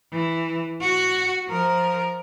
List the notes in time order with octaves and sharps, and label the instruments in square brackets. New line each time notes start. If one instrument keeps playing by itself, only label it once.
[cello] E3
F#4
F3 A#4